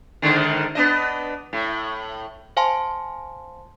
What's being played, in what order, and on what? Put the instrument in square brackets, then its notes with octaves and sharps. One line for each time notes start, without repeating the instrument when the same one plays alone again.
[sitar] G#2 D3 D#3
B3 D4 D#5
A2
[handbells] C5 F5 G#5 A5 C6